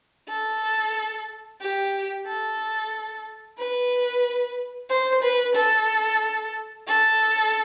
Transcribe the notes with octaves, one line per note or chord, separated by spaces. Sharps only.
A4
G4
A4
B4
C5
B4
A4
A4